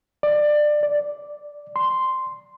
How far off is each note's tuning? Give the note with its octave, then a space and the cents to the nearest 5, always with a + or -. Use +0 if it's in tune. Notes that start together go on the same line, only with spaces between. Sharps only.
D5 +20
D5 -5
C6 -5